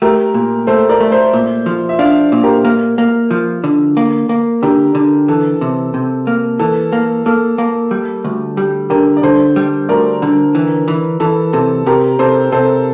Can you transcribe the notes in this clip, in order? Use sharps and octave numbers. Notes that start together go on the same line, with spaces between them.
A3 G4 A#4
A#2
A3 A4 C5
A#4 D5
A3
C5 E5
A#2
F3
E5
D4 D5 F5
A#2
G4 A#4
A#3
A#3
F3
D3
A#3
A#3
D3 G4 A#4
D3
E3 A4
C3
C3
A#3
E3 A4
A#3
A#3 A4
A#3
G3
D2
G3 G4
D3 G4 A#4
D5
D3 A4 C5
G3
D2 A#4 D5
D3
E3
E3
E3 A4
C3 A4
C3 G4 A#4
C3 A4 C5
C3 A4 C5